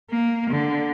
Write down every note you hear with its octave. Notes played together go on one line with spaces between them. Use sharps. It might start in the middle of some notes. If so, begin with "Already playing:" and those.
A#3
D3